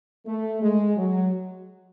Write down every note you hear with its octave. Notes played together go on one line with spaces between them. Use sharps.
A3
G#3
F#3